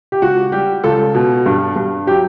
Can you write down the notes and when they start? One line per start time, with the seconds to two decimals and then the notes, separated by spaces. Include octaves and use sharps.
0.12 G4
0.22 C#2 F#4
0.52 G3 G4
0.84 C#2 A4
1.15 B2
1.46 G2
1.76 G2
2.07 F#3 G4